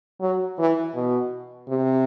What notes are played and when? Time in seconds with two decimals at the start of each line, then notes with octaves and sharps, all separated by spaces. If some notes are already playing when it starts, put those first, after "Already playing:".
0.21 F#3
0.59 E3
0.95 B2
1.68 C3